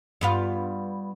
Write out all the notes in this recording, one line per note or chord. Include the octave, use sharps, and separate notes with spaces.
G2 B3 F4